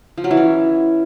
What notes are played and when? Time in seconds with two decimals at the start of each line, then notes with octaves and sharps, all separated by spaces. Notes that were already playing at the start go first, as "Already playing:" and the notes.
0.18 F3
0.24 F#3
0.31 E3
0.37 C#4